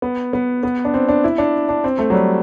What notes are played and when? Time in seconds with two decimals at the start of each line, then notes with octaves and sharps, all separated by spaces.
0.02 B3
0.33 B3
0.63 B3
0.85 D4
0.94 C4
1.09 D4
1.24 E4
1.38 D4
1.69 D4
1.84 C4
1.99 A3
2.10 F#3
2.14 G3